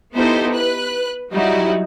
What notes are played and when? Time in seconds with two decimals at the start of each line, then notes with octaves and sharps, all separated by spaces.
0.14 B3 D#4 E4 G4 A4 C5
0.55 B4 F#6
1.31 F#3 G3 D#4 E4 F#4